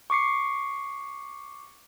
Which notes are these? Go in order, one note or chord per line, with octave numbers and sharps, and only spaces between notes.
C#6 D6 C7 C#7